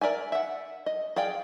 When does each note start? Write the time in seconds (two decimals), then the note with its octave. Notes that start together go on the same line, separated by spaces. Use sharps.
0.01 A#4 D5 E5 G#5
0.32 E5 F#5
0.86 D#5
1.16 G#4 D5 F5 G5